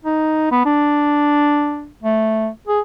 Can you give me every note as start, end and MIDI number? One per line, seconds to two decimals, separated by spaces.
0.05 0.52 63
0.52 0.62 59
0.66 1.88 62
2.03 2.49 57
2.68 2.80 68